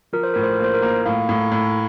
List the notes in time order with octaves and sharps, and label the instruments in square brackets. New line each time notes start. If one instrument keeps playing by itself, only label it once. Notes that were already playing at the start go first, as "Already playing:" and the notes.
[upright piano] F3 [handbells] A#4
[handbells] C5
[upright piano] A2 [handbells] A#4
[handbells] C5
A#4
[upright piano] A#3 [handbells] C5
[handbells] A#4
[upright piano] A#3
[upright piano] A2 [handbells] F5
[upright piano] A2
A2